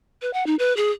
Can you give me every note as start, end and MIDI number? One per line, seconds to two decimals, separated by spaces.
0.22 0.32 71
0.34 0.46 78
0.46 0.55 63
0.59 0.75 71
0.77 0.91 68